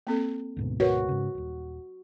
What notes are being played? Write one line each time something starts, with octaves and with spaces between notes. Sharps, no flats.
A#3 C4 A4
D2 G#2 B2
F#4 A#4 B4 C#5
G#2 C#3
D#1 G#1